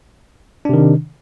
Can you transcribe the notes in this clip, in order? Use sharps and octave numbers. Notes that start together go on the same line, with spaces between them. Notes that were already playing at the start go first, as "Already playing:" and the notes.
C3 D#3 D4